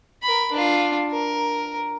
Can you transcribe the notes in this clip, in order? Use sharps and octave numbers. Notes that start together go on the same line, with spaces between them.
A#4 B5
D4 F4
A#4